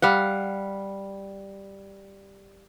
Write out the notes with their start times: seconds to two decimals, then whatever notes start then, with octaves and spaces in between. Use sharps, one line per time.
0.02 G3 F5 F#5